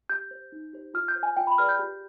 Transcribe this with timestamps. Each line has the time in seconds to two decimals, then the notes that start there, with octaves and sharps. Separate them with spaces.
0.09 G4 G6
0.31 C5
0.52 D#4
0.73 G4 C5
0.94 F4 F6
1.08 G6
1.15 C5
1.23 G#5
1.37 F4 G5
1.47 B5
1.58 G#4 B4 D5 F6
1.69 G6
1.79 G4